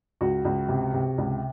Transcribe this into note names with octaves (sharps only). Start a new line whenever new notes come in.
C#2 F#4
C#2
C3
C3
C#2